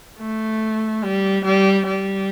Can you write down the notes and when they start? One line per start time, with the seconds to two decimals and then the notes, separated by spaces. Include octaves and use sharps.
0.19 A3
1.03 G3
1.44 G3
1.86 G3